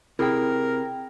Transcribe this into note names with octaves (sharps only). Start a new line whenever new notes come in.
C3 E4 G#4 A#4 G5